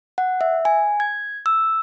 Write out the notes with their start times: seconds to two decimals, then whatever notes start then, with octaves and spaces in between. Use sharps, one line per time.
0.18 F#5
0.41 E5
0.65 G#5
1.00 G#6
1.46 E6